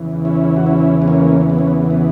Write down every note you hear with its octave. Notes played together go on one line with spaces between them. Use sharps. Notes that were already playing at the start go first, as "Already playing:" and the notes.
Already playing: E2 C#3 E3
C#4 E4
F#4
C#4 E4
B3
A#3 C#4
B3
C#4
B3
B3